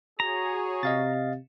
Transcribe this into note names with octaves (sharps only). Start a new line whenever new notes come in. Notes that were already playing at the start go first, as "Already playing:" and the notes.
F#4 G#4 C#5 A#5
C3 D#5 F5 A6